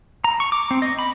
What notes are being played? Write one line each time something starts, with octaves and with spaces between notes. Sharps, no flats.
A#5
C#6
D6
C4
D#5
B5